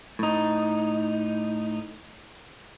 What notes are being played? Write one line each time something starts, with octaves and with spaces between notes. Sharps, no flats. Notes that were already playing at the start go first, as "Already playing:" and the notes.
A2 D#4